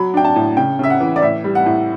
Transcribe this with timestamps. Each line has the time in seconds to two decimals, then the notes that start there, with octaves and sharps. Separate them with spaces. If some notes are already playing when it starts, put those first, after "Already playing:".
Already playing: F#3 B5
0.14 D4 G5
0.25 A5
0.36 A2
0.57 C#3 G5
0.79 C#3 E5
0.90 F#5
1.00 E3
1.16 D5
1.22 A2 E5
1.44 G3
1.55 F#5
1.66 A2